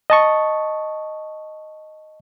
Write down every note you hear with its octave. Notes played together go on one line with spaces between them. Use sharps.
D#5 A5 C#6